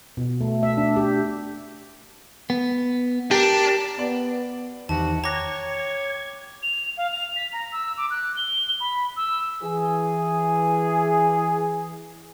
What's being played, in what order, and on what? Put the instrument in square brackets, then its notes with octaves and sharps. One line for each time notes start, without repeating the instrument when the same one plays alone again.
[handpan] B2
A3
E5
D4
G4
[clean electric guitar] B3
[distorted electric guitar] D4 [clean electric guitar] G4 A#4
[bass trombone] B3 [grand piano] D5
[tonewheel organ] E2 D#3 [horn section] C3 G3 F#4 [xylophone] A5
[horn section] C#5 [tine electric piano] G5 D6 F#6 [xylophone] A#5 A#6 [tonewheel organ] G#6
[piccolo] F7
F5
F7
B6
A#5
E6
D6
F#6
G7
B5
E6
[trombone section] E3 G#4